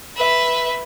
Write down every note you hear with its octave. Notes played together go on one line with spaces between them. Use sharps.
B4 E5